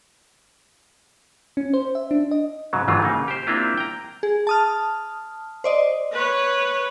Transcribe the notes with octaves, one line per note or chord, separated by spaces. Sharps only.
C#4
C5
E5
D4
D#5
G#2 C#3 F#3
G1 G#2 D#3 E3 F#3 F4
C#3 A#3 D#4
G4 C5
A#3 C4 D4 E4 F4 G4
G5 A#5
G#4
A5 D#6 F6
C5 D5 D#5
B4 C#5